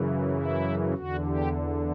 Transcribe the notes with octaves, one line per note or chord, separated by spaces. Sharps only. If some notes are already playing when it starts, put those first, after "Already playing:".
Already playing: F#2 C#3 E3
E4
E2 D3 F#4
G4